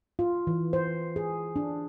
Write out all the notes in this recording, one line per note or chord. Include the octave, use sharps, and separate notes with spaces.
F4
E3
C5
G#4
D4